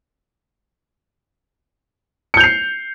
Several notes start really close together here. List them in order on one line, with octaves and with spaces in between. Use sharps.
C#7 G6 F7 C7